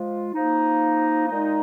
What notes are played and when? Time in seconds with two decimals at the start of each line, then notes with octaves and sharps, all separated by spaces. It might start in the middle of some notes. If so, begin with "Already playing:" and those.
Already playing: F3 G#3 F4
0.34 F3 A#3 D#4
1.27 A#2 G#3 D#4